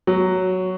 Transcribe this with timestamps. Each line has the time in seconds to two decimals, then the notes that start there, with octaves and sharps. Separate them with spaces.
0.07 F#3